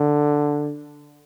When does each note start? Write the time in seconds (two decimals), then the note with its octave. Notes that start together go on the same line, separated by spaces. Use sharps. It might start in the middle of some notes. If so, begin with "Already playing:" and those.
Already playing: D3